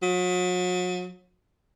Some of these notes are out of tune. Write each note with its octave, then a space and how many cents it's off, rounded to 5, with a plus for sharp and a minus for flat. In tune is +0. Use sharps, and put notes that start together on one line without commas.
F#3 -40